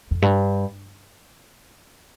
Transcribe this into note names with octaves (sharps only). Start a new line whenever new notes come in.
F2
G2